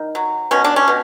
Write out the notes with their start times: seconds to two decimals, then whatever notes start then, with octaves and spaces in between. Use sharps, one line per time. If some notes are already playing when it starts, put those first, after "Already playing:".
Already playing: D#3
0.15 F#3
0.51 B2 C#4
0.64 D4
0.76 C#4
0.88 B2